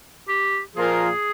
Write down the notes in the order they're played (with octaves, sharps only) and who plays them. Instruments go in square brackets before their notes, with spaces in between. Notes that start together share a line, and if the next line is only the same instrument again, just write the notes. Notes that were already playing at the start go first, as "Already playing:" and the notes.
[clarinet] G4
[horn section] A#2 F3 A#3 F4 A#4 [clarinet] G#4